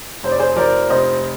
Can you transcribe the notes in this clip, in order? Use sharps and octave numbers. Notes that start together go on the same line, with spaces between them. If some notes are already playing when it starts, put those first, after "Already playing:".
F1 C5
D5
G#4 C5
F3 A#4 D5
F1 C5 D#5